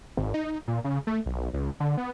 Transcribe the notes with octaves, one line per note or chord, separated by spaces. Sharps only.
G#1
D#4
A#2
C#3
A3
B1
C#2
D3
B3